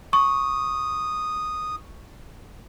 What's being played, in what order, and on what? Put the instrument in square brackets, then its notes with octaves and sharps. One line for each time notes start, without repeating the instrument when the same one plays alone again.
[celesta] C#6 [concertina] D#6